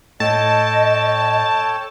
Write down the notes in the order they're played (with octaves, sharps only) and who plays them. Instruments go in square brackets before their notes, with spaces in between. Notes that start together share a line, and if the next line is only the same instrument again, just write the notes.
[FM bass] A2 [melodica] A4 C#5 G5 [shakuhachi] D#5 [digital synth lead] A5